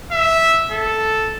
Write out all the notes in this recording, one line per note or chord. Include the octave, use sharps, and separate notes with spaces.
E5
A4